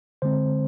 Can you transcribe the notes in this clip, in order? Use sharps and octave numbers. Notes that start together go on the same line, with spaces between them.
D3 G#3 C4 C5